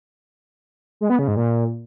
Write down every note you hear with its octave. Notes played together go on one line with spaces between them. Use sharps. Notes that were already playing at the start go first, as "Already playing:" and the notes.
G#3
B3
C#3
G#2
A#2